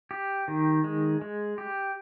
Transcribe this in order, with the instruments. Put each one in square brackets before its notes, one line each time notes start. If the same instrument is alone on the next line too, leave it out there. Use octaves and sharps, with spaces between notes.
[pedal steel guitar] G4
D#3
G#3
G#3
G4